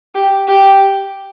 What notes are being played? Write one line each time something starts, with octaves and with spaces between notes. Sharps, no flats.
G4
G4